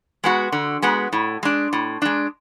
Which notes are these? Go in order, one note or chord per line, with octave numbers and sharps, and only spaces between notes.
G#3 B3 F#4
D3
G#3 B3 F#4
A2
G#3 D4
A2
G#3 D4